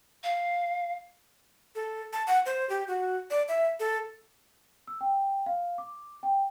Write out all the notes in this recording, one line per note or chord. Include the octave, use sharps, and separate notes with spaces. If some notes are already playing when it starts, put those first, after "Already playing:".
F5
A4
A5
F#5
C5
G4
F#4
D5
E5
A4
E6
G5
F5
D6
G5